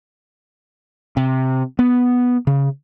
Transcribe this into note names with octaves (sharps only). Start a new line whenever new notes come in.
C3
B3
C#3